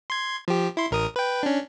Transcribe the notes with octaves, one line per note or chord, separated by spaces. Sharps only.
C6 G#6
F3 G4
E4 C6
A1 A#4 D#6
B4 G5
C#4 D4